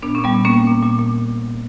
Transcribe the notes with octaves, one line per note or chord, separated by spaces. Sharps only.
A#2 B3 D4
A#2 C#4
G3 B3
A#2
A#3 C#4
A#2
A#2
A#2
A#2